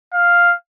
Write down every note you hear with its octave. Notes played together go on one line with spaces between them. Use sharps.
F5